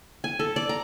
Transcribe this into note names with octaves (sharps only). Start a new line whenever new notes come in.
G#5
A4
D5
A#5